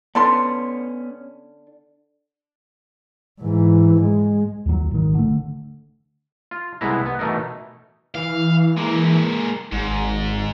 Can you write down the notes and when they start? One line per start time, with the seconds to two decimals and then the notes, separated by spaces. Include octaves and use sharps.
0.15 D3 B3 C#4 A4 C6
3.40 G#2 E3
4.01 G#3
4.66 D#2 F#3
4.91 G#1 D#3
5.14 D3 A3
6.51 F4
6.81 C2 G#3 B3 E4 A#5
7.06 B3
7.19 B2 E3 A3 D#4 A#4
8.15 E3 F5
8.77 G#3 A#3
9.72 G#1 G#2